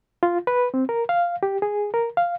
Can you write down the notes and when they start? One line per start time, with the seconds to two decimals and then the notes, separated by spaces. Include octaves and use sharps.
0.23 F4
0.47 B4
0.74 C4
0.89 A#4
1.09 F5
1.43 G4
1.62 G#4
1.94 A#4
2.17 F5